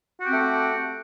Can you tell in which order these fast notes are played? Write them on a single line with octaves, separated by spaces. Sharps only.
F#4 G4 C4 A3